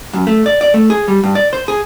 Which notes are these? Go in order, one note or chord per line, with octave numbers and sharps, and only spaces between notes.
F#2
A3
D5
D5
A3
G#4
G3
G2
D5
C5
G#4